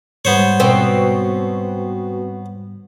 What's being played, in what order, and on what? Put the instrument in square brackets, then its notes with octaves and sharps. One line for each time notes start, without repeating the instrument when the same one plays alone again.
[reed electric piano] G#2 G3 [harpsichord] B3 C5 C#5
[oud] B2 C4